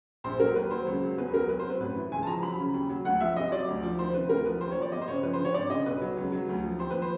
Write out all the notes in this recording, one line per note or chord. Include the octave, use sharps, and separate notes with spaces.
A#1 C5
F#3 A#4
D#2 B4
F#3 C5
C#2
F#3
E2 B4
F#3 A#4
C2 B4
C5
F#3 B4
A1 B4
E3
C#2 G#5
A5
F3 A#5
F#3 B5
C#3
D#2
F#3
D2 F#5
F3 E5
C2 D#5
F#3 D5
D2
F3
D#3 C5
C3 B4
D2 A#4
F3 B4
D#2 C5
C#5
F3
D5
G1 D#5
C5
C#3 C#5
F3 B4
C5
D3
C#5
G#1 D5
C#3 D#5
B1 B4
F#3
C#2
F#3
D2
F3
D#2 C5
F3 B4
C5